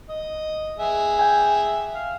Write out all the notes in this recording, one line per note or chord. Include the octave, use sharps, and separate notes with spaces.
D#5
G#4 E5
G5 G#5
F5